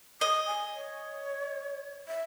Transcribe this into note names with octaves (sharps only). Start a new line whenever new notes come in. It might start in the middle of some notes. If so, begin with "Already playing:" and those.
D#5 D#6
G#5
C#5
E5